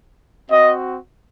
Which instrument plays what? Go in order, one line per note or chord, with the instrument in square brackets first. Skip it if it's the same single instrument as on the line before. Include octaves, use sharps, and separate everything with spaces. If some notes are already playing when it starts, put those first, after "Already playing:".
[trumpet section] C4 F#4 D#5